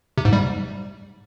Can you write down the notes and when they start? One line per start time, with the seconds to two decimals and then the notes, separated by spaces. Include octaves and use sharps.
0.18 C3
0.25 G#2
0.33 G3